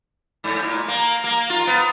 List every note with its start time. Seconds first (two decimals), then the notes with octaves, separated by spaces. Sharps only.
0.44 G#2
0.63 A#2
0.88 A#3
1.24 A#3
1.50 F4
1.67 B3